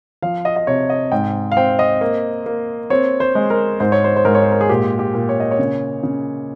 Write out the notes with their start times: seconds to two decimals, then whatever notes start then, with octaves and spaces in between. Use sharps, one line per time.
0.22 F3 F5
0.45 D#5
0.56 D#5
0.67 C3 C#5
0.90 D#5
1.12 G#2 G5
1.52 F5
1.57 C4 G5
1.79 D#5
2.01 A#3
2.46 A#3
2.90 C4 C#5
3.20 C5
3.35 G#3
3.50 A#4
3.80 G#2 C5
3.92 C#5
4.04 C5
4.16 C5
4.25 G#2 A#4
4.35 C#5
4.43 C5
4.52 A#4
4.61 G#4
4.69 A#2 G4
4.99 G4
5.14 A#2
5.29 C#5
5.40 D#5
5.51 C#5
5.59 C#3
6.03 C#3